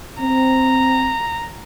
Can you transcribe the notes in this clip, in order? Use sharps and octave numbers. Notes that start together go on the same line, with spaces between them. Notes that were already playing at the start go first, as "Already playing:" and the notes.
C4 A#5